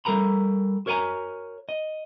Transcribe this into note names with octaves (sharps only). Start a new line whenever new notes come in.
G3 A4 A#4 A#5 B5
F#4 A#4 C#5 D5 G#5 A#5
D#5